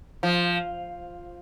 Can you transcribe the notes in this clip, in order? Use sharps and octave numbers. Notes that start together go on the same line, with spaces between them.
F3